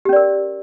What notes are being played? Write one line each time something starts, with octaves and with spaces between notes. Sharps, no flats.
C#4 G4 A#4 D5